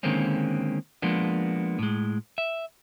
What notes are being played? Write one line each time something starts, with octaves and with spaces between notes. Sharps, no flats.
D3 D#3 G#3 A#3 C4 C#4
F3 G#3 A#3 B3 D4
A2 G#3
E5